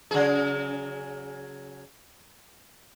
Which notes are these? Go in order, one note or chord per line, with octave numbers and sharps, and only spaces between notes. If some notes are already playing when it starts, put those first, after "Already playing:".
C#3 F#3 G#4